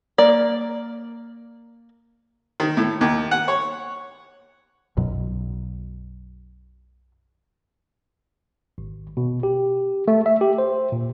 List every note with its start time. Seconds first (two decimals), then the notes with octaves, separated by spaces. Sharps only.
0.18 A#3 D5
2.60 D#3
2.77 A2
3.01 D#2
3.31 F#5
3.48 C#5
4.97 B1 F#2 B2 F#3
8.78 G#1
9.17 B2
9.43 G4
10.08 A3
10.26 E5
10.41 G4
10.58 C5
10.92 A#2